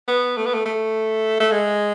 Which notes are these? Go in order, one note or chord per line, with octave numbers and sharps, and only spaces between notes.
B3
A3
B3
A3
A3
A3
G#3